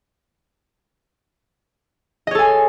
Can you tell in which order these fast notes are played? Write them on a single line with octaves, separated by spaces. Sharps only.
D#5 C#5 A4 G#5